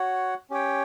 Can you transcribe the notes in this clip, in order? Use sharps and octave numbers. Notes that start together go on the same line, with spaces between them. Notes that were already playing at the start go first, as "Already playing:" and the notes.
Already playing: F#4 C#5 F#5
C#4 G4 C#5 G5